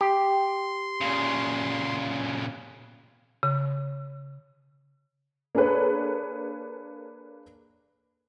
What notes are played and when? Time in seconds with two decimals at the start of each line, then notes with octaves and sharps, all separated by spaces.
0.01 G4 C6
1.01 A#2 C#3
3.43 C#3
5.55 A#3 D4 G#4 A4 B4 C#5